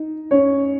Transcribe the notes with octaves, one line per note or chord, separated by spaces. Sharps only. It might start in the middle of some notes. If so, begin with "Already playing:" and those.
Already playing: D#4
C#4 C#5